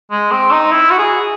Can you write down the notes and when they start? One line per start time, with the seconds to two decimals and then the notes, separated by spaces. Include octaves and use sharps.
0.11 G#3
0.32 C4
0.51 D#4
0.72 E4
0.91 F#4
0.99 G#4